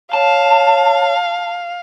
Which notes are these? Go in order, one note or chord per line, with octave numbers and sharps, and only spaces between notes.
C#5 F5 A5